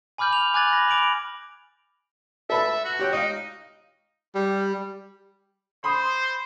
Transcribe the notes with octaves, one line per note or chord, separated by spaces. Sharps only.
G#5 B5 D6 F6 G6 F#7
F7
G#5 D6 F#6 G#6 A6 F#7
B5 A#6
B5 D6 D7 F7 F#7
A4 B4 E5 A5
F#4
G4 C#5 G5
D#4 D#5 F5
G3
C5 B5 C6 D#6